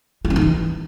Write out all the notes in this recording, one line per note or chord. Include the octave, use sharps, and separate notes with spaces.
F4
C#4
D#4
E3